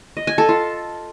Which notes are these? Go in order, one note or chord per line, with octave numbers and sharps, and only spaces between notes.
D#5
G#5
A4
F4